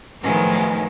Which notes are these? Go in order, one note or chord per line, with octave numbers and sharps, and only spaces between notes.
A2 D#3 F3 F#3 G#3 B3